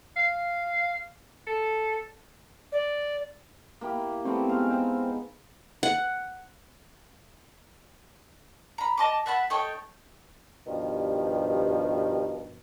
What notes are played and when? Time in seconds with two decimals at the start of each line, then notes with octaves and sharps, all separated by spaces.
0.17 F5
1.47 A4
2.72 D5
3.81 A#3 E4 G4
4.25 G3 A3 B3 C4
4.49 G#3 D#4 F5
4.69 C4
5.83 F#5
8.78 A#5 B5
8.98 D#5 A5 D6
9.26 E5 F#5 A5 B5
9.50 D#4 A4 C#5 G5
10.67 G2 B2 D#3 F3 G3